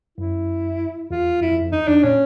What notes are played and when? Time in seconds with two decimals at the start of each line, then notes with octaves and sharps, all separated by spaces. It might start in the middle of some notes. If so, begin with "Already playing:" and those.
0.18 F#2 E4
1.10 E2 F4
1.41 F2 E4
1.51 F2
1.62 F2
1.72 E2 D#4
1.87 F2 D4
2.03 A#2 C#4